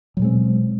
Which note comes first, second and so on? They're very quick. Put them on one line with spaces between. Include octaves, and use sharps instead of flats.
F#3 B2 G#3 C4